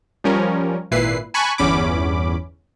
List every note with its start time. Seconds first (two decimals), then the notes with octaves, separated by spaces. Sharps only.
0.24 F3 G3 C#4 A#4
0.91 G#1 A#2 E4 B4 C7
1.34 G#5 A5 B5 C#6 F#6
1.58 G1 E2 C#4 B5 D6